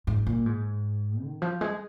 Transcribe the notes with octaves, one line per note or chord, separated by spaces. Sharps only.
G#2
A#2
G#2
D#3
F3
G#3